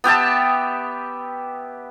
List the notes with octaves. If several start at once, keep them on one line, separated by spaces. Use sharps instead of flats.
B3 G4 E5 A5